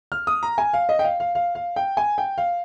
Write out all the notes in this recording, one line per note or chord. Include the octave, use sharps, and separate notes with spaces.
F6
D#6
A#5
G#5
F5
D#5
G5
F5
F5
F5
F5
G5
G#5
G5
F5